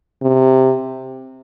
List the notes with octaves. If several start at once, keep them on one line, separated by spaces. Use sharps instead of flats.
C3